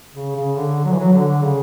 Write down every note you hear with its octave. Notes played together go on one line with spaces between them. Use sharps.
C#3
C#3
D3
F#3
E3
F#3
D3
C#3